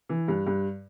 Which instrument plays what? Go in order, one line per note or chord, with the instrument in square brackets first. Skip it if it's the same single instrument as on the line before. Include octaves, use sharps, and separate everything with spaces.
[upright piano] E3
G2
G2